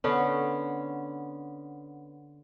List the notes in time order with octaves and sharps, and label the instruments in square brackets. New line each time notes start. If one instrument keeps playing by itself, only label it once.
[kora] D3 B3 C#4